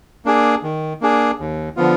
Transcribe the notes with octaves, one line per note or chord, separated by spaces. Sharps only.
A#3 D4 G#4
D#3
A#3 D4 G#4
D#2
D3 F3 B3 F4